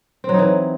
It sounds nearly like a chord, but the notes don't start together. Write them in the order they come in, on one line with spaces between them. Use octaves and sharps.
C4 F#3 D#4 E3